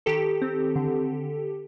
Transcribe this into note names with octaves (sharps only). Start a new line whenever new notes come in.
D#3 G4 A4
C4
D3